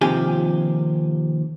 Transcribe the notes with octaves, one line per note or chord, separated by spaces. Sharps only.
D#2 C3 F3 G4 G#5